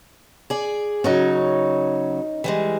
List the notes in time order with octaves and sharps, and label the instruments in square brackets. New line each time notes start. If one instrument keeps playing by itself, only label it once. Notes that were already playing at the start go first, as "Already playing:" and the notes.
[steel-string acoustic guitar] G#4 D5
[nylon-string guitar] C#3 F#3 [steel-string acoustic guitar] C#4 D#4
[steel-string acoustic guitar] E3 G3 G#3